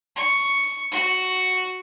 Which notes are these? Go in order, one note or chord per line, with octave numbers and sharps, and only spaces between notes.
C#6
F#4